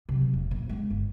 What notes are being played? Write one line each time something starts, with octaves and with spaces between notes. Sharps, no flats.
C3 F#3
F1
A#2
G#3 C#4
G1